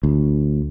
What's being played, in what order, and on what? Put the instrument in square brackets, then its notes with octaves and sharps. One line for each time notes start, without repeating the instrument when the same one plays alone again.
[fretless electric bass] D2